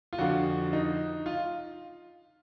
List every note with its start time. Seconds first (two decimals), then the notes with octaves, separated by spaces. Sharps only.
0.13 F4
0.18 F2 D3 F3 F#4
0.73 D#4
1.26 F4